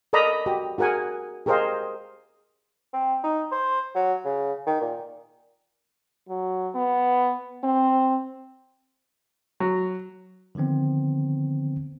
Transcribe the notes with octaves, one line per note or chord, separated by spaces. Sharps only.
A4 A#4 D5 D#5 A#5 B5
F#4 G4
F#4 G#4 A#4 F#5 G#5
G4 G#4 A#4 C5 D#5 F5
C4
D#4
C5
F#3
C#3
D#3
A#2
F#3
B3
C4
F#3
D3 D#3 F3 B3 C4